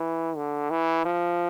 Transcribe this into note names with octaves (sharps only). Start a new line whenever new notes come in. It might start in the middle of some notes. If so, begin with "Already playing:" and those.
Already playing: E3
D3
E3
F3